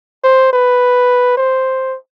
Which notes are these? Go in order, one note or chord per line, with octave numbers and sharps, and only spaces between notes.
C5
B4
C5